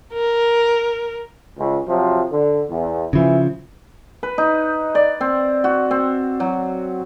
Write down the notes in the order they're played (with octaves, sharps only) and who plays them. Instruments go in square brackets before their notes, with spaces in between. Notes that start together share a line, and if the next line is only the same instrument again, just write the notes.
[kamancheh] A#4
[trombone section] C#2
C3 F3 F#3
D3
E2
[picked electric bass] C#3 F3 [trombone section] E3 E4
[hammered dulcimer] B4
D#4
D5
C4
F#4
C4
F#3